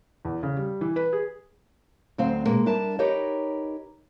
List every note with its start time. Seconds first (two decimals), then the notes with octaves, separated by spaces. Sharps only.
0.25 E2
0.43 C#3
0.57 G3
0.81 E3
0.96 B4
1.13 G#4
2.18 D2 F#3 C4 F5
2.46 B2 G#3 A#3
2.66 G3 D4 A#4 E5 A5
2.99 D#4 G4 A#4 B4 C#5 D#5